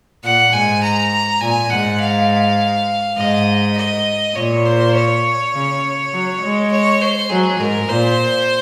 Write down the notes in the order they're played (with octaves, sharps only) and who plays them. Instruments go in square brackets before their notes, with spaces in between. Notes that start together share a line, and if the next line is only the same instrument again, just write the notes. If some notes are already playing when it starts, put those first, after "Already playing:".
[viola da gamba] A#2 [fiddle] F#5
[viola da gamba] G#2 [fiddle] G#5
[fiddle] A#5
[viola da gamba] A#2 [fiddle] G#5
[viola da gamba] G#2 [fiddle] F#5
[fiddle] F5
[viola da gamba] G#2 [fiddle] D#5
[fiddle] D#5
[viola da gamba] A#2 [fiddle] C#5
[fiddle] C5
C#5
[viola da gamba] C#3
F#3
G#3
[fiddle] C#5
C5
[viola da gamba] F#3 [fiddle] G#4
[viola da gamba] G#2 [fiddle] A#4
[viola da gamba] A#2 [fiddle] C5